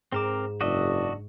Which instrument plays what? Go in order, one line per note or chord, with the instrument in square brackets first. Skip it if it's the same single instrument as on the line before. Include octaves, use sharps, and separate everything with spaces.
[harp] G#2 E7 [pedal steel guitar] C4 A#4 D6
[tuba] F#1 [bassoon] D4 [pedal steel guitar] F#4 D#5 E5